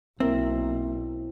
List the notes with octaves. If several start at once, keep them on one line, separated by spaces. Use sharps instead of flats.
B1 A#3 C4 E4 A#4 E5